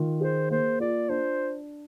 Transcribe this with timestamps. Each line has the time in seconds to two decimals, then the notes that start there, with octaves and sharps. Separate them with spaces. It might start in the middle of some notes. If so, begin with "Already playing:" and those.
Already playing: D#3 F4
0.21 G#4 C5
0.50 A#3 C5
0.80 F4 D5
1.09 D4 C5